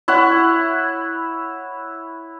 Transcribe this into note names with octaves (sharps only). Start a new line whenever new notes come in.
E4 C#5 F#5